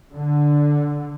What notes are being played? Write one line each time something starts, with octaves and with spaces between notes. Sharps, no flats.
D3